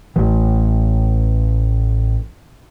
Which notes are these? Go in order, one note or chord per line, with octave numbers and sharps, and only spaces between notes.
A1 E3